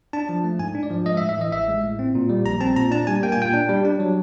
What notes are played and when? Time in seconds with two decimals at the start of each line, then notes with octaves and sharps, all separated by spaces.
0.13 D4 A5
0.29 F3
0.44 A3
0.59 G#2 G#5
0.75 D4
0.83 D5
0.90 F3
1.06 G#3 D#5
1.17 E5
1.21 A2
1.29 E5
1.38 E3 D#5
1.52 A1 E5
1.68 G#3
1.83 A2
1.99 C4
2.15 A#2
2.29 G3
2.45 A#1 A#5
2.61 C4 A5
2.76 A#2 A#5
2.91 D4 A5
3.07 G3 G#5
3.23 A#3 G5
3.32 G#5
3.38 A#2 G5
3.53 D4
3.69 G3
3.85 D4
4.00 F#3